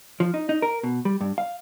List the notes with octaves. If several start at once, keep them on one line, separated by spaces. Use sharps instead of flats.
F3
D#4
D#4
A#4
B2
G3
G2
F5